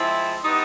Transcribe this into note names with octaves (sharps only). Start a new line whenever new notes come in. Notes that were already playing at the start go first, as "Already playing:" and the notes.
Already playing: F3 G#3 C4 E4
G3 B3 D#4